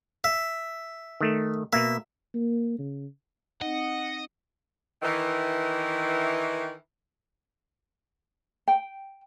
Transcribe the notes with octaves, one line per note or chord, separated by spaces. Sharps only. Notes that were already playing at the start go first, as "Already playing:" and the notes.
E5
D#3 A3
B2 A#3 E5
A#3
C#3
C4 D#4 D#5 F#5
D#3 E3
G5